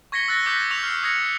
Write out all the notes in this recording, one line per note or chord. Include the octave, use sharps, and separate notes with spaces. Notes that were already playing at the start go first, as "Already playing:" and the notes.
C#6 G#6 A#6 B6 C#7 G7
E6 F#6 A6 A#6
D6 F#6 G6 A#6 B6 C#7
C#6 E6 G6 B6 F7
F6 C7
D#6 G#6 A#6 C#7